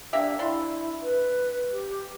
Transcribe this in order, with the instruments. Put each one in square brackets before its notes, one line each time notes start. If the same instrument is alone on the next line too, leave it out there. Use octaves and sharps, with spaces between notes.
[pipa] A#3 G4 E5 [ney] D4
[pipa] D4 C6 [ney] E4
[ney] B4
G4